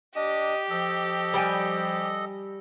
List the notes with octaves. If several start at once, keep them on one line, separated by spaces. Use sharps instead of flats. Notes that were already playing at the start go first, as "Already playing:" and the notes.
D4 G4 D#5
F3 A4 D#5
G3 G5 G#5